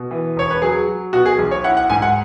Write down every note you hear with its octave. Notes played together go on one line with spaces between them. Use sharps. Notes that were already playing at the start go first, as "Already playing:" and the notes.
Already playing: B2
E3
E1 C#5
B4
F#3 G#4
F#3
B2 F#4
G#4
B1
C#5
E4 F#5
F#5
G#2 G#5
F#5